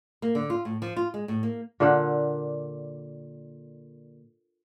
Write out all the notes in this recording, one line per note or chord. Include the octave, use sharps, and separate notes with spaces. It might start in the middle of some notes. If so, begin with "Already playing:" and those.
A#3
D3
F4
A2
F3
F4
G#3
A2
A#3
A#2 D3 A#3 F#5